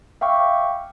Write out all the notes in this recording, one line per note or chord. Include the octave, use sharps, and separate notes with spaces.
E5 F5 G5 C#6 D6